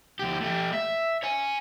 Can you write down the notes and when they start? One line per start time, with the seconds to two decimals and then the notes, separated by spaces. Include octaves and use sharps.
0.19 D2 G4
0.41 A3 G4
0.73 E5
1.23 C#5 G#5